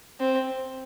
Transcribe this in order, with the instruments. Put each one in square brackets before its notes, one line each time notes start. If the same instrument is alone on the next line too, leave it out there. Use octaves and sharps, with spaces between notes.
[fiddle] C4